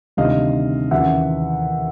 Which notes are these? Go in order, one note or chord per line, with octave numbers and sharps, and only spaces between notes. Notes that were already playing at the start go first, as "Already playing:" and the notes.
D2 C3 D#3 G3 D#5 F5
D#2 C#3 E3 E5 F#5